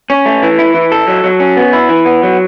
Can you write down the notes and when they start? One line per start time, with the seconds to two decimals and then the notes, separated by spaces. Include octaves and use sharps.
0.10 C#4
0.26 A3
0.43 E3
0.59 E4
0.75 E3
0.92 A4
1.08 F#3
1.24 F#3
1.40 C#4
1.57 B3
1.73 E4
1.89 E3
2.05 B3
2.23 F#3